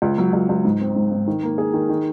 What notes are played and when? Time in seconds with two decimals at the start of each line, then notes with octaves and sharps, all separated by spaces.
0.02 C#2
0.18 F#3
0.33 C#2
0.49 C#2
0.65 G#2
0.81 C4
0.96 G#2
1.11 G#2
1.27 D#3
1.43 A#3
1.58 G#4
1.74 D#3
1.89 D#3